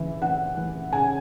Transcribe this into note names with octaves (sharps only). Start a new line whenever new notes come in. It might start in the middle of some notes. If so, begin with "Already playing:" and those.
Already playing: C#3 E3 E5
E3 F#5
E3
C#3 G#5